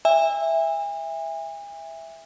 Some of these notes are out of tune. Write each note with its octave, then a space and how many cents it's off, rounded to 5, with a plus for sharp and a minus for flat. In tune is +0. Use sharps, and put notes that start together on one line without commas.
E5 +0 G#5 -40